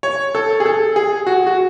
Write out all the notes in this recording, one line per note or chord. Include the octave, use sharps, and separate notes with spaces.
C#5
A4
G#4
A4
G#4
F#4
F#4